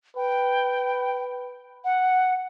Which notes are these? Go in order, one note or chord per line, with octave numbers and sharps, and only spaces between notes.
B4 G5
F#5